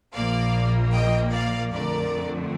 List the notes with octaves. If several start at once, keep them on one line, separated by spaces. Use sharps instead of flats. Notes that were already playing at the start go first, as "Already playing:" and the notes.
A#1 A#2 F3 A#3 D5 F5
D#5 G5
D5 F5
F2 D3 A3 A#4 D5